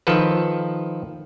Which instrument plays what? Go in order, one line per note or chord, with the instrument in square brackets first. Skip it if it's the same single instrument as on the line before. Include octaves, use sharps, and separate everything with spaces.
[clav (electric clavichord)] D#3 F3 A4 B4